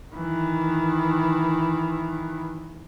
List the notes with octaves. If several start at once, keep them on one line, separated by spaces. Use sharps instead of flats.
D#3 E3